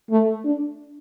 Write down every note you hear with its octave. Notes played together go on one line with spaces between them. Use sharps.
A3
D4